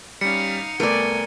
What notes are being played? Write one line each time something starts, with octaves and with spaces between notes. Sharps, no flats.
G3 C#4 D#4 F5 C#7
C2 A3 B3 A#4 D5 G5 G#5